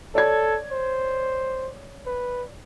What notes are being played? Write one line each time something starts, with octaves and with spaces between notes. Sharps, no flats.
A4 C#5 D5 G#6
C5
B4